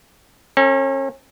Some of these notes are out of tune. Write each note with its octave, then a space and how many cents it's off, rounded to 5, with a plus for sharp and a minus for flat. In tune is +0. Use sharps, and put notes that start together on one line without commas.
C#4 -35 A4 +25